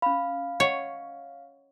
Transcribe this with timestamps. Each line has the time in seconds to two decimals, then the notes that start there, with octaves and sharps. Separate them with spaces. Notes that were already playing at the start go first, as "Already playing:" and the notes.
0.02 C#4 F5 B5
0.60 C#5 D#5 F#5 C#6